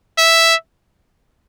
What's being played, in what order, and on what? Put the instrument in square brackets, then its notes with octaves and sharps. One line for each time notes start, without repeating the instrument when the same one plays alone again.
[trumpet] E5